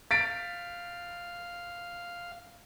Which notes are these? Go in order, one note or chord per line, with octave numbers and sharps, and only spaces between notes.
F5 A6 B6 D7